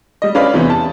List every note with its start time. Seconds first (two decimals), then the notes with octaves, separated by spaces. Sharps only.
0.22 G3 D#5
0.35 C#4 F4 B4 D5 F5 B5
0.54 E2 C3 E3
0.70 A5